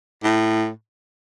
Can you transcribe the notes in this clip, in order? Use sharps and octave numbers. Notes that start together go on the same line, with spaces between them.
A2